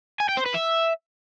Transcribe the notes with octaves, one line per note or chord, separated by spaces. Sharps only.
G#5
G5
C5
B4
E5